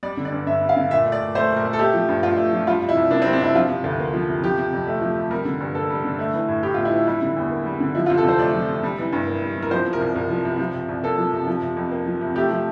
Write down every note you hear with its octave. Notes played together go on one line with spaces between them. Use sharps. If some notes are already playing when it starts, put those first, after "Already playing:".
G3 D5
D3
D5
G2
G2 E5
G3
F5
D3
A#2 E5
A3
D5
A#2
A3 C5
A#2
A#4
A3
A4
A3 G4
F3
G2
G2 F4
A3
F3
G3 F4
C3
E4
C2
A#3 D4
C4
G3
D4
C3 E4
F3 F4
C3
D2
A#3
F3
C3
F3 G4
C3
F2
A3
F3
C3
G3 A#4
D3
G2
A#3 A4
G3
D3
A3
E3
A2
A2 G4
F4
A3
E4
E3
G3 E4
D3
E2
A#3
G3
D3
F3 E4
F4
C3
A4
F2 C5
A3 D5
F3
C3
G3
E3
G2
A#3
G3
E3
A#4
F3 C5
C3
A#4
C2
C2
F3
C3
F3
C3
C2
A#3 A4
F3
C3
F3
C3
F2
A#3
F3
C3
A3 G4
F3